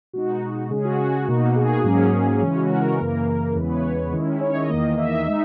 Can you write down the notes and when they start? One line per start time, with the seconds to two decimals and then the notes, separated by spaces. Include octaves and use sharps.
0.13 B2 G#3 D#4 F#4
0.70 C#3 G#3 C#4 G#4
0.85 F#4
0.98 F#4
1.27 B2 A#3 D#4
1.56 G#4
1.84 G#2 F#3 A#3 C#4
2.41 C#3 E3 G#3 C#4
2.56 F#4
2.70 A#4
2.99 F#2 C#3 E3 A#3
3.55 E2 C#3 E3 G#3 B3 B4
3.69 C#5
4.12 D#3 G#3 C#4 E4
4.41 C#5
4.55 D#5
4.69 E2 D#3 A#3
4.98 E5
5.27 G#3 D#4